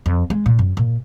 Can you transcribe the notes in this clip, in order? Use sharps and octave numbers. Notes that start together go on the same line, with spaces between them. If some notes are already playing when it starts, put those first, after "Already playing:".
F2
G#3
A#2
F#2
A#2